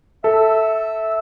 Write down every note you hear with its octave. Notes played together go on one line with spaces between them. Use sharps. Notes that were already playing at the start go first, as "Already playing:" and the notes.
A4 E5